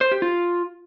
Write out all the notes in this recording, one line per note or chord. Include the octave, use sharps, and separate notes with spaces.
C5
G4
F4